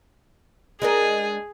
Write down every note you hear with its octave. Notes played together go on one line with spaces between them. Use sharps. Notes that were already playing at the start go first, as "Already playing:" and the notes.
G#3 D4 G#4 A#4